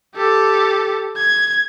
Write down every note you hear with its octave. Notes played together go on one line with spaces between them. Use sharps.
G4 A4
G#6